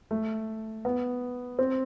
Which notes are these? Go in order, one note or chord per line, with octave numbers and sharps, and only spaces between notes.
A3
B3
C4